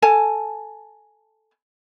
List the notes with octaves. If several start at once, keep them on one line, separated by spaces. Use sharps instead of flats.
A4 G#5 A5